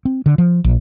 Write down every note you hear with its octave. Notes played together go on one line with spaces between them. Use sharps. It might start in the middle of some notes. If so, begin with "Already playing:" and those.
C4
D3
F3
A#1